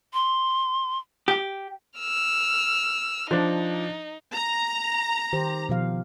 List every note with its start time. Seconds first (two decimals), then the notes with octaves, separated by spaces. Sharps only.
0.14 C6
1.28 G4
1.99 E6 F6
3.31 F3 D4 D#4
4.35 A#5
5.33 D#3 G4 C5
5.69 B2 F3 F5